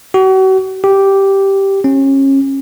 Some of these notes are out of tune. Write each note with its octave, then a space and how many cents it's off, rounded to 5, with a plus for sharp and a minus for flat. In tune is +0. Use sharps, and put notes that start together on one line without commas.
F#4 +40
G4 -5
C#4 -30